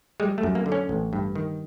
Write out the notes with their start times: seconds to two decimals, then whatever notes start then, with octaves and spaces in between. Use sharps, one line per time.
0.20 G3 G#3
0.38 A3
0.43 F#2
0.55 A#3
0.66 D3
0.72 C#4
0.89 A1
1.13 G2
1.36 D#3